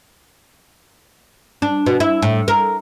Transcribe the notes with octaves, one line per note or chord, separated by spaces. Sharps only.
D4
B2
E4
A2
A#4